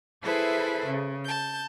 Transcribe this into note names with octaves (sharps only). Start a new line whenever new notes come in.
E4 G#4 A4 B4 C5 E5
C#3
A5 G6